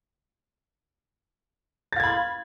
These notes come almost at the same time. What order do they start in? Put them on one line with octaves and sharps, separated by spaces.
A6 F5 G#6 B5 C6